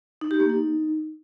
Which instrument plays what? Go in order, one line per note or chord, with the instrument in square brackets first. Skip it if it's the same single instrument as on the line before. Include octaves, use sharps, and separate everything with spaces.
[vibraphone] D#4
G4
A#3
D#4